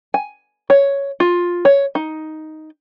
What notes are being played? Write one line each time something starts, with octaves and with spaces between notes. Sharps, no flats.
G#5
C#5
F4
C#5
D#4